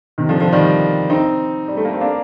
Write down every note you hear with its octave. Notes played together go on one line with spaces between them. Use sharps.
C3 D#3
D3 F3
D3 F3
D#3 G3
C4 D#4
G3
A3
A#3
C4
A#3 D4